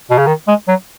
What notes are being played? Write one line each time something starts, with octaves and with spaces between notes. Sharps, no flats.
B2
C#3
D#3
G#3
F#3